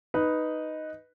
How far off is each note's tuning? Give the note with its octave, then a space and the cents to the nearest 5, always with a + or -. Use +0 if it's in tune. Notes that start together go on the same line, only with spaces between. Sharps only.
D#4 +0 B4 +0